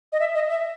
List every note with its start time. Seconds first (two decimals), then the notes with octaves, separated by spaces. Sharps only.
0.12 D#5
0.20 E5
0.35 D#5
0.49 E5